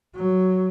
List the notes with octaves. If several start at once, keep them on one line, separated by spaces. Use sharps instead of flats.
F#3